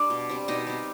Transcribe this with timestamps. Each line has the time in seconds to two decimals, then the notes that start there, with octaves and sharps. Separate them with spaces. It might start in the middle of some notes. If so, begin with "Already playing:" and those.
Already playing: G3 D4 D5
0.10 B2
0.29 G3 C4
0.48 B2 D#4 D#5
0.67 G3 C4